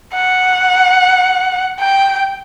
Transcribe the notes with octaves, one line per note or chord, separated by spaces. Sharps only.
F#5
G5